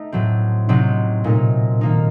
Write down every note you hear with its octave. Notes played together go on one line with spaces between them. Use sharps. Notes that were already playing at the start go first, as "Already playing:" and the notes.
Already playing: A3 D#4
A2 F#3 C4
C3 F#3 C4 D#4
A#2 A3 D#4
D#3 A#3 D#4